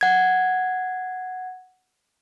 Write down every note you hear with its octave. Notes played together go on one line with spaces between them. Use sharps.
F#5 G#6